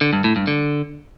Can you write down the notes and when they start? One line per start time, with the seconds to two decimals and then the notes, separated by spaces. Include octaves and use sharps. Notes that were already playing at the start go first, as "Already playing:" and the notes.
0.01 D3
0.13 G2
0.24 A2
0.36 G2
0.47 D3